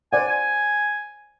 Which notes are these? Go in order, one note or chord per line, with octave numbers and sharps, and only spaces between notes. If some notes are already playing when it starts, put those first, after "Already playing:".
C5 D5 F#5 G#5
G#5